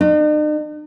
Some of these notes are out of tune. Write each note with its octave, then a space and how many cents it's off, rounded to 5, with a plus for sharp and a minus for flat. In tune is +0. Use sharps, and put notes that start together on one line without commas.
D#4 -45